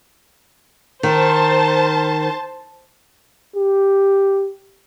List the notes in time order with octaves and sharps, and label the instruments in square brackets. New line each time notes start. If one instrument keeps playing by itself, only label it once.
[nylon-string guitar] D#3 [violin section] C5 A5
[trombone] G4